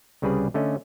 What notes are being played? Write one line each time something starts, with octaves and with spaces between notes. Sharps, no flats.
C2 C#3 G3 G#4 B4 D5
D3 A3 C#4 D#5